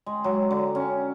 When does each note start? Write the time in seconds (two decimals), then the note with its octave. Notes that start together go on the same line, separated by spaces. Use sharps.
0.06 G#3
0.24 F#3
0.51 D3
0.75 C#4